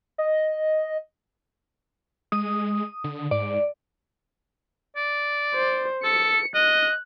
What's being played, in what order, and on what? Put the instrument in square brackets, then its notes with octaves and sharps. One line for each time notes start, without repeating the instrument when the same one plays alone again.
[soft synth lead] D#5
[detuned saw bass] G#3 [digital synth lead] D#6
[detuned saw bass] D3
[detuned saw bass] G#2 [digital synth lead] D5
[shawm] D5
[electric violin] C5
[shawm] A4 [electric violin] C#7
[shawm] D#5 [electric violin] F#6